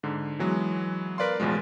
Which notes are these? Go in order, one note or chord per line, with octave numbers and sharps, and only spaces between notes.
G#2 D3
E3 F#3 G#3 B3
A#4 B4 D5 F5 C6
A1 E2 B2 F3 G#3